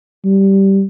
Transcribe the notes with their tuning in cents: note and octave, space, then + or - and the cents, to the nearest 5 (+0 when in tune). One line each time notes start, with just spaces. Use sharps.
G3 -10